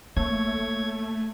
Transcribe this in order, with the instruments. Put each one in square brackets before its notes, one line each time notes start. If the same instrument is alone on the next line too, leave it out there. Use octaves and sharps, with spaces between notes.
[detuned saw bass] A3 [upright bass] A#3 [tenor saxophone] C#5 [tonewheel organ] G#6